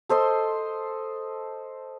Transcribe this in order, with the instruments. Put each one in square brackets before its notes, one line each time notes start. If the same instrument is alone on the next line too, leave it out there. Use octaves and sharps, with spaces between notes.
[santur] A4 C5 D#5 C6